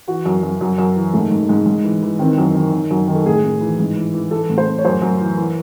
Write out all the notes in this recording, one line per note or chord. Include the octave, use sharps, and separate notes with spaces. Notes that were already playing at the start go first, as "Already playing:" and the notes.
E3 F#4
F#2
F#2
F#2
F#2
E3
G#2 A3
G#2
G#2
G#2
E3
E3
D#3 C4
F#2
D#3
D#3
F#2
D#3
A4
A2 G#4
A2
E3
G#2
E3
E3
E3 A4
A2
C5
A2
C#5
F#2 C5
F#2
E3
E3